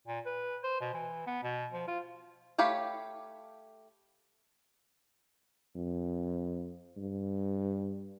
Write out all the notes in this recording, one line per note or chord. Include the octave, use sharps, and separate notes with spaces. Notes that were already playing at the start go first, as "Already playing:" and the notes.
A#2
B4
C5
B2
E3
B3
B2
F3
F4
A3 G4 C#5 F5 B5
F2
G2